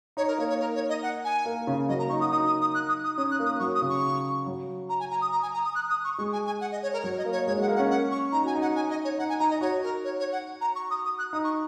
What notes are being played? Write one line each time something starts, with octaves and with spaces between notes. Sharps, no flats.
D#4 C#5
A#4
A#3 C#5
C#5
A#4
C#5
D#5
F#5
G#5
A#3
C#3
F#3 D#5
A#3 A#5
D#4 C#6
F#4 D#6
D#4 D#6
D#6
D#6
F#6
D#6
D#6
C#4 D#6
F#6
A#3
D#6
F#3 C#6
D#6
C#3
C#6
F#3
A#5
G#5
A#5
D#6
A#5
G#5
A#5
D#6
F#6
D#6
C#6
G#3 C#6
G#5
G#5
F#5
D#5
C#5
A#4
F#3 C#5
D#5
A#3
C#5
G#3 C#5
G#3 F#5
A#3
F#5
C#4
F#5
C#6
D#4 A#5
F#4 G#5
D#4
F#5
G#5
D#5
C#5
D#4 F#5
G#5
D#4 A#5
D#5
F#4 C#5
A#4
C#5
C#5
F#5
A#5
C#6
D#6
D#6
F#6
D#4 D#6
C#6